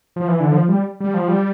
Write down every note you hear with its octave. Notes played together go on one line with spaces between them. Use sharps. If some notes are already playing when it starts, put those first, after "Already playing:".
F3
E3
D3
F3
G3
G3
F3
G3